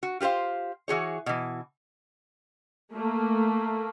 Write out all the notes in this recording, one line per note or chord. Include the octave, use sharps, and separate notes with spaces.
F#4
F4 G4 B4 C5 F5
E3 F#4 G#4 C#5
B2 E3
A3 A#3